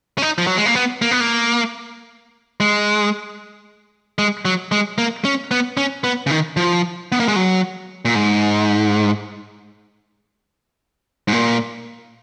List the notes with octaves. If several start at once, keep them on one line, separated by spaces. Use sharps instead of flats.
C#4
D#4
F3
F#3
G#3
A#3
B3
A#3
B3
A#3
G#3
G#3
F#3
G#3
A#3
C#4
B3
C#4
B3
C#3
D#3
F3
B3
A#3
G#3
F#3
A#2
G#2
G#2
A#2